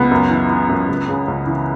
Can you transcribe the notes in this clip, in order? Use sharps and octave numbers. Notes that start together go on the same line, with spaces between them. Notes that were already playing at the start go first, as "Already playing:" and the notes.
Already playing: C#2 B3
F#2
E3
E3
F#2
C#2
C#3
C#2
E3